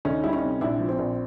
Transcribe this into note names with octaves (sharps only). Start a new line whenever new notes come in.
D2 C#4 D#4
G3 E4
C#4 D#4
C3
A#1 D4 E4
F3
C4
A#1